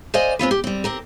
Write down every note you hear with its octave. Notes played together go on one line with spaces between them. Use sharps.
C5 D5 D#5 F5 G#5
G#3 C4 F4 B4
G4
G3 C4
C4 G4 A#4